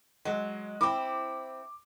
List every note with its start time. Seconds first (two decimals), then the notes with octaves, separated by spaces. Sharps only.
0.25 F#3 G#3
0.81 C4 E4 D6